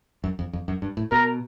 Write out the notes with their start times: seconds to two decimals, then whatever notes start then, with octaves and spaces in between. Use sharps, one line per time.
0.24 F#2
0.39 F2
0.53 F2
0.68 F#2
0.82 G2
0.97 A2
1.12 B2 A#4